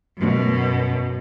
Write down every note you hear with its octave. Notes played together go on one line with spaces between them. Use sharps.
F#2 B2